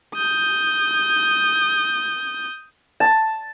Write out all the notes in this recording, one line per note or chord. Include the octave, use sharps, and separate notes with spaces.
D#6 G6
A5